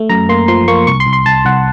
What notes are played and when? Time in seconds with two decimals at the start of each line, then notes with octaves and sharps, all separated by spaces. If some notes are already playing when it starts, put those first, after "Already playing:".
Already playing: A3
0.09 F#2 A#5
0.29 A#3 C6
0.48 F3 C6
0.68 A#3 C#6
0.87 C2 C#6
1.00 C6
1.07 C2
1.13 C6
1.26 C2 A5
1.45 C2 F#5